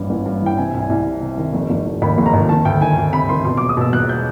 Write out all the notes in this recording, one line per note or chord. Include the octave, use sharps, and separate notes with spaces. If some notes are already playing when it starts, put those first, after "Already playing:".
Already playing: A1 G2 E3
A1
G2
E3 G5
C3 G#5
C2
G#5
C2
C3
C3
D#3
F1
F1
F1
D#2 B5
F1
A#5
D#2
D#3 A5
D2 G5
D#3 G#5
D2
C3 B5
D#3 C6
B2 C6
E1 D6
D#6
B2 E6
E1 F#6
G6